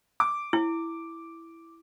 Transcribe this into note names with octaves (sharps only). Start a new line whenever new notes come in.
D6
E4